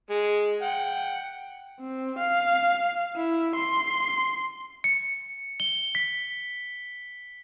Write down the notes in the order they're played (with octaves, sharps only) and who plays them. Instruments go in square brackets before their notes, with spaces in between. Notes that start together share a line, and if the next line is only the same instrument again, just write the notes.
[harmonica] G#3
F#5 G5
[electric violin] C4
F5
E4
C6
[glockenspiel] C#7
G7
B6